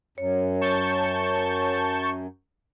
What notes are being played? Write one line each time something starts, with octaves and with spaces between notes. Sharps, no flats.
F#2 C#5
A5 C#6 G6